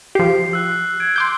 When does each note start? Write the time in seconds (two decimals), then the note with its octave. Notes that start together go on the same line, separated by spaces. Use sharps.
0.15 F3 G4 C7
0.53 E6 F#6
1.00 G#6 D7
1.16 C6 D6 G6